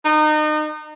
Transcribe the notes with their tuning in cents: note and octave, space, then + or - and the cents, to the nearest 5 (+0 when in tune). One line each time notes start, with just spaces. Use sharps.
D#4 -30